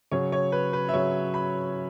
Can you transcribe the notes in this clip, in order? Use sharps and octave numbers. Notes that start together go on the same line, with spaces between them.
C#3 F#3 C#5
C#5
B4
B4
E5
C#3 F#3 C#5
B5